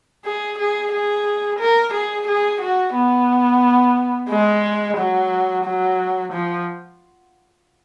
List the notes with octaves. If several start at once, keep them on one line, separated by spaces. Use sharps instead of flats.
G#4
G#4
G#4
A#4
G#4
G#4
F#4
B3
G#3
F#3
F#3
F3